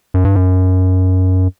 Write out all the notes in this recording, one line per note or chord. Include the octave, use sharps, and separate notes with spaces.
F#2
G2
F#2